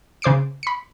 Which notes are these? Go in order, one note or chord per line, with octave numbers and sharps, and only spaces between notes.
C#3 C5 D6 C7 D7
B5 C#7